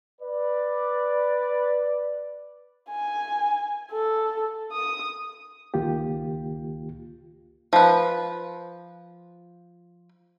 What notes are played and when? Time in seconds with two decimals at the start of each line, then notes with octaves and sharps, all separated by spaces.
0.22 B4 D5
2.90 G#5
3.92 A4
4.72 D#6
5.74 C#2 D#3 A#3 F4 G4
7.73 F3 B4